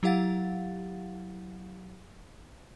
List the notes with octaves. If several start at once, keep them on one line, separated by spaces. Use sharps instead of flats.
F#3 E4 G4 F5 F#5 A6